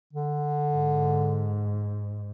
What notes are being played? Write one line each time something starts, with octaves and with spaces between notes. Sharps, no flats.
D3
G#2